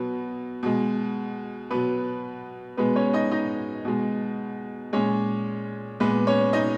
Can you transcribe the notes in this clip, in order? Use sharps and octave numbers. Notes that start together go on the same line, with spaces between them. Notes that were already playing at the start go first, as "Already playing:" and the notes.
Already playing: B2 F#3 B3
B2 G#3
B2 F#3 B3 B4
B2 G#3 B3 B4
C#4 C#5
D#4 D#5
D#4 D#5
B2 G#3
A#2 G#3 C#4 C#5
A#2 G#3 B3 B4
C#4 C#5
D#4 D#5